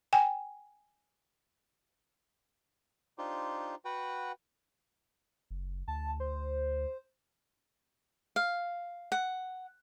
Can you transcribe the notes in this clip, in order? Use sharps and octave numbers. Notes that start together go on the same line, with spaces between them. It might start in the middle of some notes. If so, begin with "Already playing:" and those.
G5 G#5
D4 D#4 F4 G4 C5
F#4 B4 F#5 G5
F#1
D2 A5
C5
F5
F#5